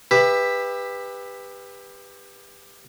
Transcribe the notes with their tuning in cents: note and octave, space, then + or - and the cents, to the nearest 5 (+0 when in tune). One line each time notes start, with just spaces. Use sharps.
G4 +25 B4 +0 E5 +0